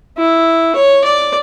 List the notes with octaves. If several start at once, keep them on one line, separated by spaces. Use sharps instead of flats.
E4
C#5
D5